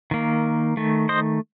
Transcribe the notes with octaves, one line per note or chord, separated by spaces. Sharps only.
D#3 A#3
D#3 A3
C5 D#5